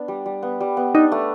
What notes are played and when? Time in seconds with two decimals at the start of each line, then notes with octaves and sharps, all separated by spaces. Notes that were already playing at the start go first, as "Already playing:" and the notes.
Already playing: B3 D4
0.08 G3
0.26 G3
0.43 B3
0.60 G3
0.77 B3
0.95 D4 D#4
1.12 A3